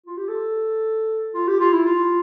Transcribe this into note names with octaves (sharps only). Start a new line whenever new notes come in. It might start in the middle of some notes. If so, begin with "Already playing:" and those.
F4
G4
A4
F4
G4
F4
E4
F4